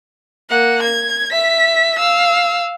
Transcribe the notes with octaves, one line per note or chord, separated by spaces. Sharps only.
A#3 F#5
G#6
E5 B6
F5 E6